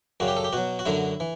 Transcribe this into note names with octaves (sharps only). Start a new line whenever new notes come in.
F#2 C#3 G3 F#4
G4
A4
G4
B2 F#3 F#4
F#4
F#2 D3 F#3 E4
E3